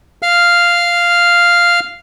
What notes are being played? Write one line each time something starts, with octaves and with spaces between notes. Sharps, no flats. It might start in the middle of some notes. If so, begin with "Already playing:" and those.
F5 F6